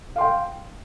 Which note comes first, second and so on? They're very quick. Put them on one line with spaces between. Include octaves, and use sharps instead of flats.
F5 C6 G5